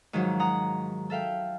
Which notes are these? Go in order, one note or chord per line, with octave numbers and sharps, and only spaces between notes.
G#2 D#3 F3 F#3
F#5 A#5 D#6
A4 E5 F5 G5